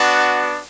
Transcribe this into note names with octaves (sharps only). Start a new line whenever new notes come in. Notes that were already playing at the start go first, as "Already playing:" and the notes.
Already playing: B3 D4 F#4